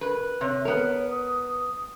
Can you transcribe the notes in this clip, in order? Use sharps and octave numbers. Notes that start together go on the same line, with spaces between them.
A#4 B4
C3 C#5
B3 A#4
D#6